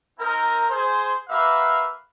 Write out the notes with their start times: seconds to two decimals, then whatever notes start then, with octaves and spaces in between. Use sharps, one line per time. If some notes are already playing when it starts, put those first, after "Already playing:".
0.19 C4 D#4 A#4
0.70 G#4 C5
1.29 A#3 F#4 B4 E5 F5